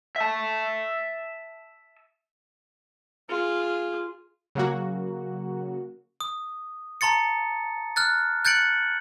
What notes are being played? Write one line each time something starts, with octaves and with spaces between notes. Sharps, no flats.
E5 A5
F4 G#4
C#3 F#3 A#3 F#4
D#6
A5 A#5 C6 A6 C#7
F6 F#6 A6
F#6 G6 A6 C#7 D7 F#7